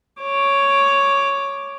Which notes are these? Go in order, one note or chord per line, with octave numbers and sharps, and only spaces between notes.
C#5 D6